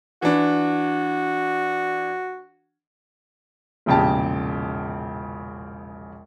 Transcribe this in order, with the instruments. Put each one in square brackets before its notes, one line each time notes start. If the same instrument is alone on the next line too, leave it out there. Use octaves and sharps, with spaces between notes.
[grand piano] E3 D4 [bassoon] F#4
[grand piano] E1 A#1 C#3 G4 A5